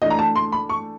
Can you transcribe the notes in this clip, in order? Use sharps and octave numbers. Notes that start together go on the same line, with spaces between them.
E3 A3 D4 D#5
A#5
A5
C6
B5
C#6